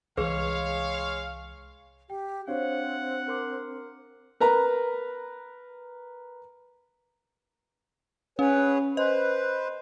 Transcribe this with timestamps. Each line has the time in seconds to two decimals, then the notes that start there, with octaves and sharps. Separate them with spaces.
0.17 C2 E3 G#3 G#4 B4 C#5 F5
2.10 G4 G5
2.48 C4 D4 F#4 C5 C#5 F5 F#5
3.28 A#4 C6 D6
4.40 A#4 B4 A#5
8.39 C#4 G#4 B4 C#5
8.97 B4 C5 D#5